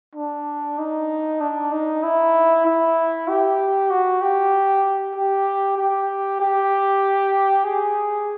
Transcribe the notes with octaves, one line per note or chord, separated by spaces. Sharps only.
D4
D#4
D4
D#4
E4
E4
G4
F#4
G4
G4
G4
G4
G#4